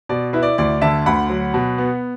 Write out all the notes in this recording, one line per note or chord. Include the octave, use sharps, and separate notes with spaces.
B2 D5
E4 B4
D5
D2 D5
D3 E5 A5
D2 F#5 B5
F#3
B2
B3